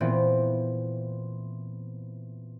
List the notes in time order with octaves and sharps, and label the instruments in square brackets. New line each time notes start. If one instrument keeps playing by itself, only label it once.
[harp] A#2 E3 B3 C4